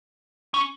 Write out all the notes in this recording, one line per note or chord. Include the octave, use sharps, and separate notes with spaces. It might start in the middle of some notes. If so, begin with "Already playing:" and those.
C#4